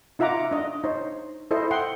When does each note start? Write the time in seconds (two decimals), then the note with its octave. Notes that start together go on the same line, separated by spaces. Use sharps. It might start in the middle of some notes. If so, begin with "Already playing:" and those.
0.19 D#4 F4 E5 F#5 A#5 D6
0.51 D4 D#5
0.84 D#4 C5 C#5
1.51 E4 A4 C5 D#5
1.71 F#5 G5 C6